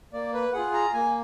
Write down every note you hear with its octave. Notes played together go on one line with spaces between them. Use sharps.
A#3 D5
B4
F4 G#4 F#5
A#5
A#3 G#5